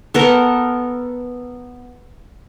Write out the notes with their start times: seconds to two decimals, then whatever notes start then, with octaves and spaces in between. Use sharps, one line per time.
0.14 B3 A4 A#4